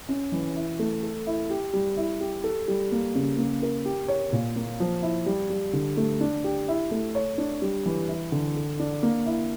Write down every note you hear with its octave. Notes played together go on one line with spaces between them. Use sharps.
C#4
E3
E4
A3
A4
E4
G4
G3
E4
G4
A4
G3
A#3
C#3
A#3
A#4
G4
C#5
A#2
A#3
F3
E4
G3
G3
D3
A3
D4
G4
E4
A3
C#5
D4
G3
E3
E4
D3
A4
D4
A#3
E4